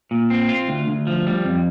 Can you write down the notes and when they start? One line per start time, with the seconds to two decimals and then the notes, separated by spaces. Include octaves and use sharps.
0.11 A#2
0.30 C4
0.49 F4
0.68 D2
0.88 D2
1.07 F3
1.27 G3
1.45 F2